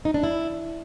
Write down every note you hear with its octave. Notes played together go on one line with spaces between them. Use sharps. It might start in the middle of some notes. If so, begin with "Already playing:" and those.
D#4
D4
E4